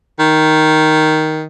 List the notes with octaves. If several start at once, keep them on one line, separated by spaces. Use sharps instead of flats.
D#3